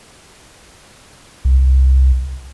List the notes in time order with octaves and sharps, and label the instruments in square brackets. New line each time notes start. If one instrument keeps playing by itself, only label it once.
[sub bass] C2